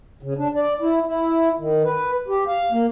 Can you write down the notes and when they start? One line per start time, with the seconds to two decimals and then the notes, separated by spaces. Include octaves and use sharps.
0.23 C#3
0.37 D4
0.55 D5
0.80 E4
1.07 E4
1.58 D#3
1.84 B4
2.28 G4
2.48 F5
2.72 A#3